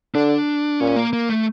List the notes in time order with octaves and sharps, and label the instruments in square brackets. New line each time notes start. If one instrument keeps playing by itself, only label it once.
[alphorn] D3 [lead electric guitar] D4
[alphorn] A#2 [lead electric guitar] C#4
[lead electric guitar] A#3
A#3
A3